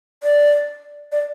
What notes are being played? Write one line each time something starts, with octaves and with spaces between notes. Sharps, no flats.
D5
D5